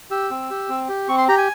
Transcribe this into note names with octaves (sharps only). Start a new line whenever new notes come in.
G4 E6
C4
G4
C4
G4
C4 C#6
C6
G4 A#5
G#5